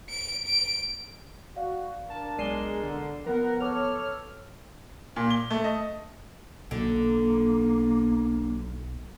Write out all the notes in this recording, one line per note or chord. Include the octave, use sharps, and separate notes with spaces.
D7
D7
F#4 D5 F5
D4 A#4 A5
B1 G#3 D5 C7 D#7 E7 G7
D3
F3 B3 A#4 F#5
A4 B4 C#5 D6 F6
A#2
G7
A3
D#5
B1 D3 A#3